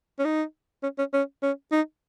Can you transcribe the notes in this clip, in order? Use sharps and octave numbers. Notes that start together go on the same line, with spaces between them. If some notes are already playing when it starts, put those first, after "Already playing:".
C#4
D#4
C#4
C#4
C#4
C#4
D#4